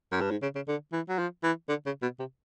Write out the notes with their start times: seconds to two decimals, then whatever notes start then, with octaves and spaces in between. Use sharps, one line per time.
0.12 F#2
0.21 G2
0.31 G#2
0.42 C#3
0.55 C#3
0.68 D3
0.93 E3
1.09 F#3
1.19 F3
1.44 E3
1.69 D3
1.86 C#3
2.02 B2
2.19 C3